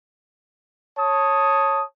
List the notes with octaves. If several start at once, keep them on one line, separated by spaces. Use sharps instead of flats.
C#5 A5 D#6